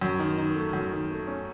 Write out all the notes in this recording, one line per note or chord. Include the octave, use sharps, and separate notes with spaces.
F#2
D#3
D#3
A3
F#2
D#3
A3
C#4